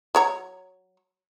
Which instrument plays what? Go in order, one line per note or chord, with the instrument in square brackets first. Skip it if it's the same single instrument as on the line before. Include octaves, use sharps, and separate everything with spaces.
[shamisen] F#3 C#5 A#5